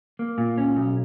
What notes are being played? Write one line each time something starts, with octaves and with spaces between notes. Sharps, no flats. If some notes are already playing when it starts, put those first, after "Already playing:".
A#3
A#2
C#4
B1